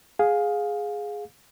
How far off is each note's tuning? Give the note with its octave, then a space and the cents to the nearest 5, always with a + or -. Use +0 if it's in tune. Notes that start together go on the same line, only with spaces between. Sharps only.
G#4 +0 F5 +20